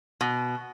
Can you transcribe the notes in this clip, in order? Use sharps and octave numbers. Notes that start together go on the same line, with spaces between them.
B2